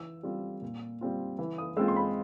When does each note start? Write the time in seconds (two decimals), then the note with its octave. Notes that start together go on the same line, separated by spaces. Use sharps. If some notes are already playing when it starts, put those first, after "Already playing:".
Already playing: E3 E6
0.23 G3 C4 F4
0.62 A#2
1.01 G3 C4 F4
1.39 E3
1.58 D#6
1.77 G#3 C4 F4 E6
1.88 C6
1.96 B5